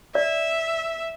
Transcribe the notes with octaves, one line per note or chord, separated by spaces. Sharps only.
D5 E5